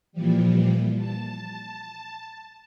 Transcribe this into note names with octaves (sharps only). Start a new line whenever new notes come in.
A#2 E3 F3 G3
A5